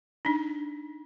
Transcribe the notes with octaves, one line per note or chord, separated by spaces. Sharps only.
D4 D#4